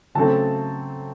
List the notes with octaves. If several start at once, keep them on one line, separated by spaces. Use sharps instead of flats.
C#3 F#3 A3 C4 A4 A5